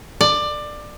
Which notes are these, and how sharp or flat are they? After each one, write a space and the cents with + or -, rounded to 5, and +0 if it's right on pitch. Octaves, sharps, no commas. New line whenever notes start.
D5 +20